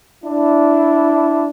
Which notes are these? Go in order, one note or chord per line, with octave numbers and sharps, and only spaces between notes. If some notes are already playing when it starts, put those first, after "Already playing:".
D4 E4